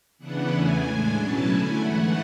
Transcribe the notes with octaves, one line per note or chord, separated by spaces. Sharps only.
C#3 E3 B3 D4 F#5
E2 C#3 E3 A3 G#5
A2 G#3 D4
B2 F#3 C#4 E4 A5
D3 A3 E4 G#5
G#2 E3 A3 F#5